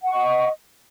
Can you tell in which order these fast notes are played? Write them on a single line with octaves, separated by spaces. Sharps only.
F#5 C#6 D#5